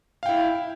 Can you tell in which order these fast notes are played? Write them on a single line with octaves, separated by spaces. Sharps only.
F5 G5 E4